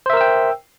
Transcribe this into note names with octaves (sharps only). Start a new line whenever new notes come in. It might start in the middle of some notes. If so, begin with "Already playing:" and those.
A#4 C5 E5 G5 E6